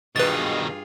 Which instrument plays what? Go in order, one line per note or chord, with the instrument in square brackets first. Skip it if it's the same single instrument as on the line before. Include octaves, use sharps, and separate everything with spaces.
[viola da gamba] G2 F4 G#4 [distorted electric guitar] B2 D#3 [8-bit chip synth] B4 A6